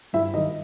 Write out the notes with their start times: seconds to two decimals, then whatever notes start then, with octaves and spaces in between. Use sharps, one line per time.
0.13 G2 E4 E5
0.34 D#3 G3 D#4 D#5